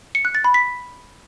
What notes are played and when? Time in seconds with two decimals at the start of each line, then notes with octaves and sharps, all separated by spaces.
0.15 C#7
0.25 F#6
0.35 A6
0.44 B5
0.54 B6